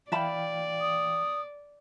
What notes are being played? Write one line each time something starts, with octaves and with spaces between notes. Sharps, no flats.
E3 D5 E5 F5 G5 A5 B5
D#6